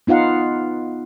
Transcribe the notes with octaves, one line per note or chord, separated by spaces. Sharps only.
B3 D#4 F4 F5 F#5